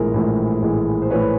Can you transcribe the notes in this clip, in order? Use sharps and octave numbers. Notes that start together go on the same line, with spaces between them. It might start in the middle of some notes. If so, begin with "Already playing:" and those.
Already playing: A#1 A2 E3 G#3 A#4
A#1 A2 E3 G#3
A#1 A2 E3 G#3
C5
A2 E3 G#3 B4 C#5